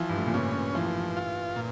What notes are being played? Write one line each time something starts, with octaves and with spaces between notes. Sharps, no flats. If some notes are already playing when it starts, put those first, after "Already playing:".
Already playing: E3 F3
G2
A2
A#2
C#3 C#4
E3 F3
F4
A#2